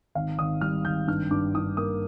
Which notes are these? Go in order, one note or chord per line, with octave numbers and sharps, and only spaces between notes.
G#1 F5
G#1 D#6
G3 F6
G#1 G6
G2 F6
G2 D6
G2 D#6
A#3 D#6